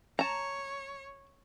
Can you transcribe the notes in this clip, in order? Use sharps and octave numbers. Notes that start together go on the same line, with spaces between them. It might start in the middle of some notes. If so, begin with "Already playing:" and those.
C#5 A5 A#5